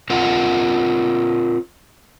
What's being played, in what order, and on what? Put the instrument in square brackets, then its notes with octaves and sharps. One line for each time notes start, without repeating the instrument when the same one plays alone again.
[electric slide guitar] C4 F4 A#4 C5 F#5